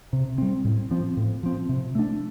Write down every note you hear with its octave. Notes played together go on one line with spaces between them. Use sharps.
C3
G3 C4
A2
F3 C4
A2
F3 C4
C3
A3 D4